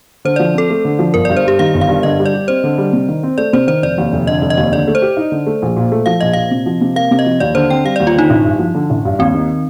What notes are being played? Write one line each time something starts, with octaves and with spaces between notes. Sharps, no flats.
D3 C5
F3 D5
C4 A4
A3
D3
F3
G1 A#4
G2 D5
C5
G3 G4
D#3 F5
G1
F5
G2
D3 D#5
G3
D5
G4
C4 C5
D3
G3
C3
D#3
C4
A3 D5
C3 C5
D#3 C5
F1 D5
D#2
F1
D3 D#5
F1
D#5
D#2
D3 D5
A3
C5
G4
D#4
D3
A3
A#1
A#2
A3
F3 F5
A#1 D#5
A#2 F5
C3
F3
C3
A#3 F5
C3
D#5
F3
D#2 D5
D3 C5
C4 G5
G3 F5
D#2 D5
F4
D3 D#4
A1
G2
F3
D3
A1
G2
D#2 C4
D#3